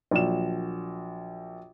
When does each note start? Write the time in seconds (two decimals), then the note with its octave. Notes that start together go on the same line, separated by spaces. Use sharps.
0.11 A#1 F#3 E7